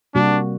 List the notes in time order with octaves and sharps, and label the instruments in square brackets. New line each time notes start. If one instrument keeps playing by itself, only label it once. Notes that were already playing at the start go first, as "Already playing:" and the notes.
[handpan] C3 G3 A#3 F#4 [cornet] D4